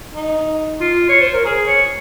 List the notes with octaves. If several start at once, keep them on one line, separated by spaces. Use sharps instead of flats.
D#4
F4
C#5
C5
A#4
G#4
C#5